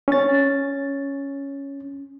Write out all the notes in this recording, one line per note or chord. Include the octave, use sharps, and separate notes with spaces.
C#4 A6